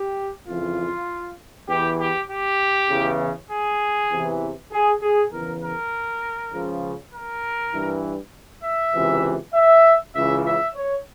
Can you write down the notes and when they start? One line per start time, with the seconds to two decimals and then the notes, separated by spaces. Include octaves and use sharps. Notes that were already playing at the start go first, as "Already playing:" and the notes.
Already playing: G4
0.48 F2 C#3 E3 F4
1.69 E2 E3 G4
1.99 G4
2.29 G4
2.90 E2 C#3 E3
3.50 G#4
4.11 E2 C3 E3
4.72 G#4
5.02 G#4
5.32 E2 C#3 E3 A#4
5.62 A#4
6.53 C#2 C#3 F3
7.13 A#4
7.73 G2 E3
8.64 E5
8.94 C#2 C3 E3
9.54 E5
10.15 C#2 C#3 E3 E5
10.46 E5
10.75 C#5